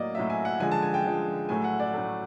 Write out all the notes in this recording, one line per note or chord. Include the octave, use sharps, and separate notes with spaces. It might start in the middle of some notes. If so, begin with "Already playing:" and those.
Already playing: A2 F#3 A#3 D5 D#5
A2 F#3 A#3 E5
G#5
F#5
D3 F3 G#3 G#5
A5
G#5
G5
D3 F3 G#3
A2 F#3 A3 G#5
F#5
D5
A2 F#3 A3